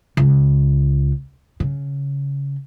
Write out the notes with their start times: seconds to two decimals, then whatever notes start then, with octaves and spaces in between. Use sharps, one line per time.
0.17 C#2
1.60 C#3